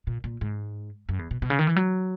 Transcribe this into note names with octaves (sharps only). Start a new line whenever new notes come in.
A#2
A#2
G#2
F#2
E2
B2
B2
C#3
D#3
E3
F#3